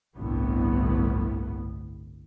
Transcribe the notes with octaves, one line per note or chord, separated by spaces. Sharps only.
G1 C2 A2 B3